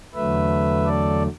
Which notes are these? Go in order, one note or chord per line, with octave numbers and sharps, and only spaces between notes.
E2 D3 F#3 A3 B4 E5
A4 D5